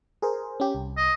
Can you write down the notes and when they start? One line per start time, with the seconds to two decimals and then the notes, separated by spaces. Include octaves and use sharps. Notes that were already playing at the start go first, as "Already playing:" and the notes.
0.22 G#4 A#4 C5
0.60 C#4 G4
0.75 C2
0.97 D#5